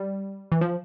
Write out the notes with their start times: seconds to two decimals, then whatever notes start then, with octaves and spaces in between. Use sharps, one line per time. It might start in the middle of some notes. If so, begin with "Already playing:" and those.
Already playing: G3
0.52 E3
0.61 F3